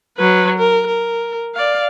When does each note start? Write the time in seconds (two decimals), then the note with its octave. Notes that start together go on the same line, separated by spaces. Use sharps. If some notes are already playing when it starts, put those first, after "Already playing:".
0.17 F#3 B4
0.59 A#4
0.87 A#4
1.55 D5 F5